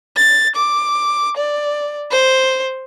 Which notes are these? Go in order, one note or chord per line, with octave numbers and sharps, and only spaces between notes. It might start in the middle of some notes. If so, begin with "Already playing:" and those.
A6
D6
D5
C5